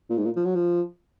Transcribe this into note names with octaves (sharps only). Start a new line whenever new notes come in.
A#2
G#2
A#2
F3
F#3
F3